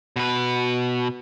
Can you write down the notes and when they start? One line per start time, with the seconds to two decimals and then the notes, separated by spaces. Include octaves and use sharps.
0.16 B2 B4